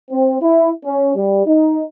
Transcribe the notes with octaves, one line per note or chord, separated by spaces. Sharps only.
C4
E4
C#4
G3
D#4